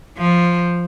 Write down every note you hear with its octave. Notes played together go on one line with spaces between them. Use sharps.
F3